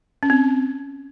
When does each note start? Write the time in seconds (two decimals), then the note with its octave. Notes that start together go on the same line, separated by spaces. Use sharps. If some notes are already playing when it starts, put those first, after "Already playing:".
0.23 C#4
0.30 C4